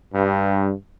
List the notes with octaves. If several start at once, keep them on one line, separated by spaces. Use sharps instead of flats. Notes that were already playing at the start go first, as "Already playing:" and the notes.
G2